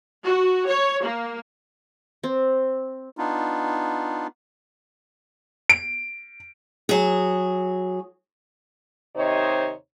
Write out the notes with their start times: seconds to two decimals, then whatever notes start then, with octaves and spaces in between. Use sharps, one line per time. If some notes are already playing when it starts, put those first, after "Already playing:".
0.25 F#4
0.68 C#5
1.04 A#3
2.24 C4
3.17 B3 D4 D#4 F4
5.69 D7
6.89 F#3 G#4
9.17 D#2 C3 D#4 C5 C#5 D#5